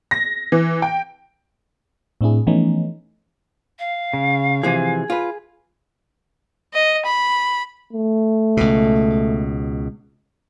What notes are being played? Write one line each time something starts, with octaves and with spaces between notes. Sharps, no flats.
A#6
E3
G5
A2 C4 D4 E4 G#4
E3 F3 A3 B3 C#4 D#4
F5
C#3
C3 E3 F3 G#4 G#5
F4 B4
D#5
B5
A3
C#2 B2